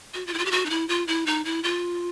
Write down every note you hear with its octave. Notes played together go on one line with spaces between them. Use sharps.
F#4
F4
E4
F4
G4
F#4
D#4
E4
F4
E4
D#4
E4
F4